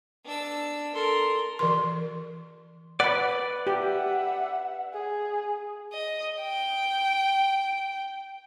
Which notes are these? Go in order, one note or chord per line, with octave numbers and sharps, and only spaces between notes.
D4 E6
A4 A#4 C6
E3 A#4 C6
B4 D5 F#5 B5
G4 E5 F#5
G#4
D#5
G5